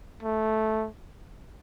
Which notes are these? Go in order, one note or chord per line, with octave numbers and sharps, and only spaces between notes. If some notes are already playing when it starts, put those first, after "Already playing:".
A3